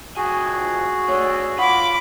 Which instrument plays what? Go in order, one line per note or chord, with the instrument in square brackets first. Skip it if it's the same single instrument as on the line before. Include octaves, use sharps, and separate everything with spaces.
[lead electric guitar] F2 G#5 [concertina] F#4 G#4
[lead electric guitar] A3 D4 [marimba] C#5
[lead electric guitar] F4 [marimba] F#5 [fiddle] B5 D6